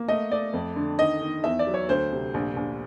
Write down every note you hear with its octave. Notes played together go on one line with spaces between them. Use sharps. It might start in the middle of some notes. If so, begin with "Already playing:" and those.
Already playing: A#3
A3 D#5
A3 D5
F2
D3
D#3 D#5
D#3
E2 E5
D5
F#3
C#5
D2 C5
C3
A#1
A#1